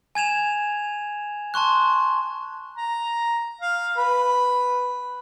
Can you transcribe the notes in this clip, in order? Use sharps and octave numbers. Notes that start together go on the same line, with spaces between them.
G#5 G#6 E7 F7
A5 C6 C#6 F#6
A#5
F5
B4